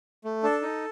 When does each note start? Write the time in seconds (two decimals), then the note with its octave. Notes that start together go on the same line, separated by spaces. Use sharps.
0.24 A3
0.43 D4 A4
0.62 D#4